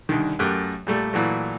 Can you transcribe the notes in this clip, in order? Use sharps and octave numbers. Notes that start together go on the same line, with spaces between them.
C2 D3 D#3
F#2 A3 G4 A#4 G5 F#6
A#2 G3 A3
A#2 E3 F#3 A3